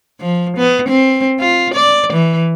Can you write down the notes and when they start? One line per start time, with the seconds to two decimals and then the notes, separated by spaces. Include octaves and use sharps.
0.21 F3
0.57 B3
0.88 C4
1.40 F4
1.74 D5
2.13 E3